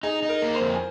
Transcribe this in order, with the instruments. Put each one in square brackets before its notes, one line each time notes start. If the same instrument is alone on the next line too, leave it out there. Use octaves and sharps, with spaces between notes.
[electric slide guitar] D#4 [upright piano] G#4
[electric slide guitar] D#4
[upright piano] A#4
[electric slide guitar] A#3
[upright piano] C5
[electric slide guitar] F2
[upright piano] G#5